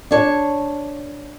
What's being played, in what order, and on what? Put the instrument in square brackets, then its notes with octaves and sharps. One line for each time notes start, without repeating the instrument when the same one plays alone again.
[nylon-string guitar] D4 C#5